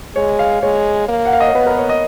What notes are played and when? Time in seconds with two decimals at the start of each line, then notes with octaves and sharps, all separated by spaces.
0.15 G#3 C#5
0.39 F5
0.62 G#3 C#5
1.09 A#3
1.25 F#5
1.33 F5
1.40 D#5
1.47 C#5
1.55 B3 B4
1.66 A#4
1.78 C#5
1.89 D#5